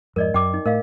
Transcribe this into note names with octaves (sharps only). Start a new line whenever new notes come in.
F2 G#2 A#4 D5 D#5
F#2 G5 D6
D#4
A2 A#4 D#5 F5